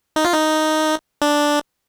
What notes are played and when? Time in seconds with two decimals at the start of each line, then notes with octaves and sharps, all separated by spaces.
0.16 D#4
0.25 F4
0.33 D#4
1.22 D4